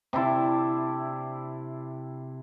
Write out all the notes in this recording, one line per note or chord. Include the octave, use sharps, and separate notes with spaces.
C3 D4 E4 A5